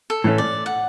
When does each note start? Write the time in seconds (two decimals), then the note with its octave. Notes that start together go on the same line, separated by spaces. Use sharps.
0.10 A4
0.24 A2 E3 A3 C#4
0.38 D5
0.66 F#5